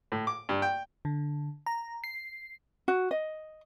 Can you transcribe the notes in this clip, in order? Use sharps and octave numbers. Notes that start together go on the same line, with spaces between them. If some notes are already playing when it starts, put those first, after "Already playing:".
A2
D6
G2
G5
D3
A#5
C7
F#4
D#5